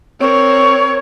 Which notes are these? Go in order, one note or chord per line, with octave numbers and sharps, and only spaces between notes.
C4 A#4 C#5